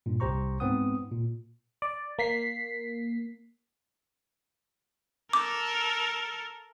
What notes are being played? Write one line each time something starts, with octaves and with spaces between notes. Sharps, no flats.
G2 A#2
C2 G4 C5 A#5 C#6
G#2 B3 C4 B4 F#5 D#6
A#2
D5
A#3 B6 C7
A4 A#4 D6